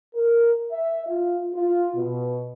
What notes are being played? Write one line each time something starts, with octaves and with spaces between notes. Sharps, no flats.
A#4
E5
F4
F4
B2